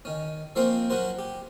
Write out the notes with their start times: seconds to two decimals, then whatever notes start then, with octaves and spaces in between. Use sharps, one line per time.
0.05 D#3 C#4
0.56 F3 A#3 C4 C#4 A#4 C5
0.90 F#3 C#4 F#4 A#4 C5
1.19 G4